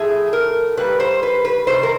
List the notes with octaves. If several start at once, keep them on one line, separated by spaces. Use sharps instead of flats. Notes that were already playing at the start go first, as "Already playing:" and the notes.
Already playing: A2 F3 A3 G#4
A#4
A#2 G3 A#3 B4
C5
B4
B4
C3 D#3 G3 C5
A#4